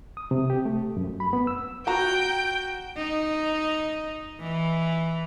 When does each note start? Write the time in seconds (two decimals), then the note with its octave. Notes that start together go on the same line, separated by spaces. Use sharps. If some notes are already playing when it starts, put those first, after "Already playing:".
0.17 D#6
0.31 C3
0.50 G4
0.65 A3
0.97 F#2
1.20 B5
1.33 B3
1.47 E6
1.87 F#4 G5 A#5
2.97 D#4
4.40 E3